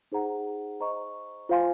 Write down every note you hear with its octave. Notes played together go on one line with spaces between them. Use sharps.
D#4 G#4 C5 F#5 A#5
C5 D#5 A#5 C#6
F4 C5 F5 G#5 C6